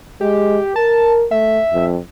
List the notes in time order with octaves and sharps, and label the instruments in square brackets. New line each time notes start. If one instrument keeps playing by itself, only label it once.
[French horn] G#3 [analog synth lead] G4
[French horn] A#4 [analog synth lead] A5
[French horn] A3 [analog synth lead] E5
[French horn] F2